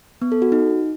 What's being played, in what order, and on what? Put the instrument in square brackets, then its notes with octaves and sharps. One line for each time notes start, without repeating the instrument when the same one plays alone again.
[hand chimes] B3
A4
F#4
D#4